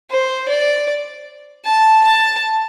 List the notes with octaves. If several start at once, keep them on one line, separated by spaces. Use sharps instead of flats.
C5
D5
A5
A5